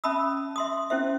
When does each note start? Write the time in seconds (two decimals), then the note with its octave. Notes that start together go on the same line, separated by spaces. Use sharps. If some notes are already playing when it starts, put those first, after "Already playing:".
0.04 C#4 E5 A5 B5 D#6 E6
0.56 E5 C6 D#6
0.90 C#4 E4 C5 E5